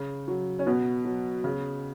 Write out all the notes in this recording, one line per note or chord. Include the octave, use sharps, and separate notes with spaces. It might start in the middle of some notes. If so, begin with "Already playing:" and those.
Already playing: C#3
F#3
C#4
B2 B3
F#3
C#3